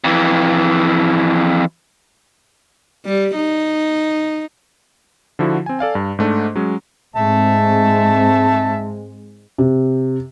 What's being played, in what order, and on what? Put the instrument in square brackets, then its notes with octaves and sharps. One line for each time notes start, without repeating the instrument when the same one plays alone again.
[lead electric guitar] F2 E3
[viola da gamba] G3
D#4
[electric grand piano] D3 F3 E4 F#4
C4 G#5
A4 D5 F5 G#5
G2
G#2 A3 D4
F#3 G#3 C#4
[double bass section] G#2 G#3 C4 [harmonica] E5 A5
[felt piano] C3